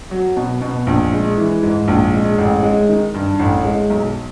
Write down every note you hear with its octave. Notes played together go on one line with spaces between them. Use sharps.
F#3
B2
B2
A#1
G#3
E3
G#2
A#1
G#3
A1
G#3
D#3
G2
A1
G#3
B1